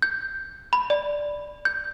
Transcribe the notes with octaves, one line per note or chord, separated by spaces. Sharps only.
G6
B5
D5
G6